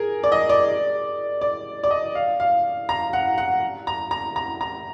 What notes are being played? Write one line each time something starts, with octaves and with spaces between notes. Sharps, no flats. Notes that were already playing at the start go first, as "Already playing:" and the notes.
Already playing: G#4 A#4
D5
D#5
D5
D5
D5
D#5
F5
F5
A#5
F#5
F#5
A#5
A#5
A#5
A#5